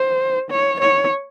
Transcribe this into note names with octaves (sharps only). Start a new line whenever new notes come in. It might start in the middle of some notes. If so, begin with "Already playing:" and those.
Already playing: C5
C#5
C#5